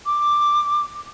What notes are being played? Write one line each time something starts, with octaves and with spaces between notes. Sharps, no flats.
D6